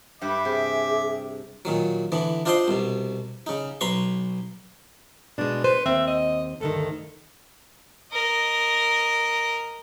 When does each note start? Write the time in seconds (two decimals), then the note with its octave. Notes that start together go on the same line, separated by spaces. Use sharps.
0.21 G2 G3 B4 E5 D6
0.45 C3 G4 G#4
1.65 A#2 D#3 F#3
2.12 D3 E3 B3
2.46 D4 F4 C5 D#5 G5 C6
2.68 C2 B2
3.46 C#3 D#4
3.81 B1 B4 A#5 C6 C#6
5.38 B2 G#3 D4
5.64 B4 C5
5.86 D#2 C4 E5
6.07 D#5
6.61 D2 G2 D#3 A4
8.13 A#4 D#5